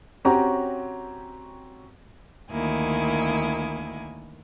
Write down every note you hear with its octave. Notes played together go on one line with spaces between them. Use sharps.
C4 C#4 F#4 G4 C#5 A#5
D2 D#3 A#3 E4 G#5